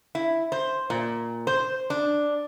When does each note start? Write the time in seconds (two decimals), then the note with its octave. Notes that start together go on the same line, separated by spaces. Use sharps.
0.15 E4
0.52 C5
0.90 A#2
1.47 C5
1.90 D4